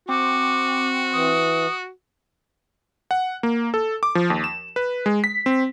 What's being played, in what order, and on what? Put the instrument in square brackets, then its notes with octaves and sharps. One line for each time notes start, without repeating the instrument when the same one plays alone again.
[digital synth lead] C4 [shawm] F#4 [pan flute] D6
[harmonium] E3 [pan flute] D#6
[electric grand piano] F#5
A#3
A4
D6
F3
D#2
E7
B4
G#3
B6
C4